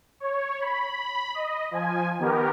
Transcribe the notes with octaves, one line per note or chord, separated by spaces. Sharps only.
C#5
B5
D#5
F3 G#5
D#3 B3 G4 A#4